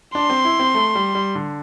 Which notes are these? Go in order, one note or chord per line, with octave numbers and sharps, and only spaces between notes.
D4 C6
C4
E4
C4
A3
G3
G3
D3